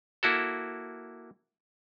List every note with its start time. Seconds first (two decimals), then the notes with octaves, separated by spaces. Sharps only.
0.23 A#3 E4 F#4 A4